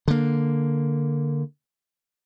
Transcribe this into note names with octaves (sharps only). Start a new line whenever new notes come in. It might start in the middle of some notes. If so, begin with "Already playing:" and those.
D3 A#3